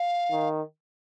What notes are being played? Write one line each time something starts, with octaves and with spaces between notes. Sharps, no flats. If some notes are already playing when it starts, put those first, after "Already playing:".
Already playing: F5
D#3